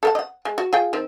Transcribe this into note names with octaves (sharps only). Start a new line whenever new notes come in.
A4 A#4 F#5
D#5 F#5
G#3
F#4
F4 G#4 G5
D#3 C4